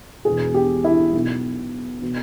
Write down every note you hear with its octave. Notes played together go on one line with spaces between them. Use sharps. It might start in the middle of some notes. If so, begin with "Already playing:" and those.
E1 E2 B2 G#4
G4
E4
B1 B2
B2